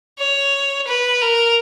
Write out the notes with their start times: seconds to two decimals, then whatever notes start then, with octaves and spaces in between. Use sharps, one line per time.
0.18 C#5
0.87 B4
1.22 A#4